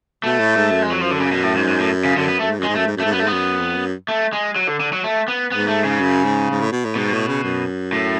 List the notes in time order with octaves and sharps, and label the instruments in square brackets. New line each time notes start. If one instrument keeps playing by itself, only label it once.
[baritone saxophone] B2 [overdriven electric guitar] A3
[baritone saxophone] A2
G#2
F#2
[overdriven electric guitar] G#3
[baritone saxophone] F2 [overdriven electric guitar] F#3
[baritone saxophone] F#2 [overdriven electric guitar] F3
[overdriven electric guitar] D3
C#3
B2
A2
G#2
G#2
A2
C#3
[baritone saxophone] F#2 [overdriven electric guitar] D3
[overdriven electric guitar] B3
[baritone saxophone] F#2 [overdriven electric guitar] A3
[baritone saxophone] G#2
[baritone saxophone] F#2 [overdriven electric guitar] G#3
[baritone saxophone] G#2
[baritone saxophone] F#2 [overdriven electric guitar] A3
[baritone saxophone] G#2
[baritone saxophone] F#2 [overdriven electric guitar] A3
[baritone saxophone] G#2
[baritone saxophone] F#2 [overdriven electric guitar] B3
[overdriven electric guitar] A3
[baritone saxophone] G#2 [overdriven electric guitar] B3
[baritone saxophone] F#2
F2
F#2
[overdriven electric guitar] A3
G#3
F#3
D3
D3
F#3
A3
B3
[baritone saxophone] G#2 [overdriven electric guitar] B3
[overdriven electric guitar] A3
C#3
[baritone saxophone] F#2
G#2
G#2
A2
B2
A2
[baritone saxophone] G#2 [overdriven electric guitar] B2
[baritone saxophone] A2
C#3
F#2
[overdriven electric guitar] A2